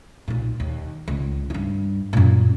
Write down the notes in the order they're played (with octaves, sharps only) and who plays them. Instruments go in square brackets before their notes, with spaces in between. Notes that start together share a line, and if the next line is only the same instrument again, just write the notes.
[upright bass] B1 A#2
D#2
C#2
G2 F4
F#2 A#2